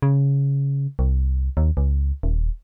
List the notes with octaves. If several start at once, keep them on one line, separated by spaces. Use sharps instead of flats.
C#3
C2
D#2
C#2
D#1